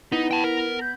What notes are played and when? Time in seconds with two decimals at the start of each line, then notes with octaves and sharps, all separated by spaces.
0.12 B3 D#4 E4
0.31 G5 A5
0.44 A#4
0.81 G6